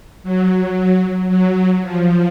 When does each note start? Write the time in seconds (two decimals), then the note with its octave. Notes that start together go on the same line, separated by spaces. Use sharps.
0.23 F#3
1.29 F#3
1.82 F3